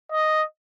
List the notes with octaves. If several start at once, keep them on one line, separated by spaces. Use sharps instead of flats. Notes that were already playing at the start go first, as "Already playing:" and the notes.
D#5